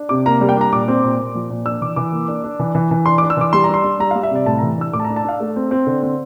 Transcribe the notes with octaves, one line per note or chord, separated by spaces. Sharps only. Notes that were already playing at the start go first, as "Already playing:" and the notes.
Already playing: D4
C3 D6
A#3 A#5
G3
G5
D4 A#5
A#2 D6
C4
A#2
A#2
F3
A#2
D4 E6
E3 D6
E3 D6
A#3
D4
D4
E3
E3
E3
D4 C6
D6
D4
E6
E3 D6
G3 C6
D4 A#5
C6
D4
G3 A#5
F5
G3
E5
C3 D5
A2 A5
A#5
E3
D4 E6
A2 D6
A5
A#5
D4
A5
D4 F5
A3
C4
C4
D3
C4